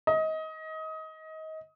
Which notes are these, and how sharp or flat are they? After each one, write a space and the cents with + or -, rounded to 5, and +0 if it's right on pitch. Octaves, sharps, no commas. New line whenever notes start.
D#5 +25